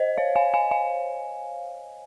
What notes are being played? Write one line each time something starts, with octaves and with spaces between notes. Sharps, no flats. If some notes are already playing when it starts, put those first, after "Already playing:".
Already playing: C5 D#5
C#5 F5
F5 G#5
F5 G#5
F5 G#5